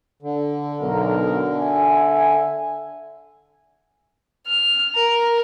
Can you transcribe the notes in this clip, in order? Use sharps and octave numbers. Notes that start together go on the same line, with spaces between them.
D3
B1 D#4 A#4
E5 G#5
F6
A#4